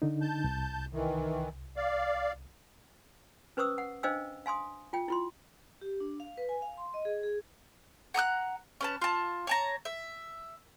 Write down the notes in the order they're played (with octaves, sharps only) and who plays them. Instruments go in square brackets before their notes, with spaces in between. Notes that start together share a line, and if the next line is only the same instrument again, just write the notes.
[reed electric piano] D3 D#4
[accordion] A5 G6
[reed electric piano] C2
[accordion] D#3 E3
D5 F5
[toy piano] C#4 B4 C5 C#6 D#6 E6
F#5
D4 C5 D#5 F5 G5 E6
F5 G#5 C6 D#6
F4 G5
E4 F4 C6
[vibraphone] G4
D4
F5
B4
G#5
F5
C6
D#5
G#4
G#4
[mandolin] F#5 A#5 D#6 F#6
C#4 B4 A5
F4 A5
C#5 A5 A#5
E5